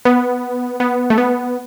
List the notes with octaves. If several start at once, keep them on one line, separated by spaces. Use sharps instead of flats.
B3
B3
A3
B3